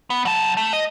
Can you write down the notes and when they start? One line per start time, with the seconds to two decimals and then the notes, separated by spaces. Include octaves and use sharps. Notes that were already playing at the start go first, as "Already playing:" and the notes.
0.10 B3
0.25 F#3 A5
0.57 A3
0.73 D#5